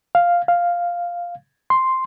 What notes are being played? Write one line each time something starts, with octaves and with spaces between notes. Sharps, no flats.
F5
F5
C6